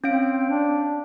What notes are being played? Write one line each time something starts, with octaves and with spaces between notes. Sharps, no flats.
C4 C#4 F5 D7
D4